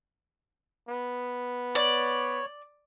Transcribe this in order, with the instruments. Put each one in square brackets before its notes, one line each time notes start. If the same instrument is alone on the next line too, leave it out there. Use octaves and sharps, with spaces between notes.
[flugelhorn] B3
[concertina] C#5 [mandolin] D5